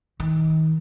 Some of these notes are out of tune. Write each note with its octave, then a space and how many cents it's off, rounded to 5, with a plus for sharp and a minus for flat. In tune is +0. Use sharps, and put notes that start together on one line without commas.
D#3 +30